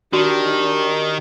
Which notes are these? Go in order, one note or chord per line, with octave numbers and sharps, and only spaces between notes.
D#3 D4 F#4 G4